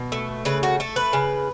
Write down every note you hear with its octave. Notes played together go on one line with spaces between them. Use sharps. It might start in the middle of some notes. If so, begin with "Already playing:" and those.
Already playing: B2
A3
C#3 B4
F#4
A3 A4
B4
C#3